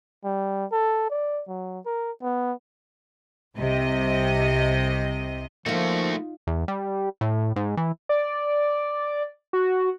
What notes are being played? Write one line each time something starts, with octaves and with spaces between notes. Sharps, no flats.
G3
A4
D5
F#3
A#4
B3
C2 C3 D#5
F3 A3 A#3 D#4 F4 F#4
E2
G3
A2
G#2
E3
D5
F#4